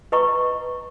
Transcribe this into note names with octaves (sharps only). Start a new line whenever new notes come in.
B4 D#5 A#5 C#6